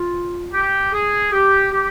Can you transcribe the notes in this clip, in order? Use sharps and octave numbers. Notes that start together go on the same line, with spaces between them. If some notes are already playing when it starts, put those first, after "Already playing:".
Already playing: F4
G4
G#4
G4
G4